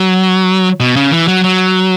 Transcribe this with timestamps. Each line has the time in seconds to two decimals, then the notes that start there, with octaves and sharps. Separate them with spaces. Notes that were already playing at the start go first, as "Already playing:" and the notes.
Already playing: F#3
0.80 B2
0.96 C#3
1.12 E3
1.28 F#3
1.44 F#3